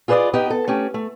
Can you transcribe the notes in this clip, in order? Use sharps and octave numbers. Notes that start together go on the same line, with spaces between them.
F4 G#4 B4 C5 D5 D#5
B3 D#4 G4 G5
A4
A3 C#4 G4
A3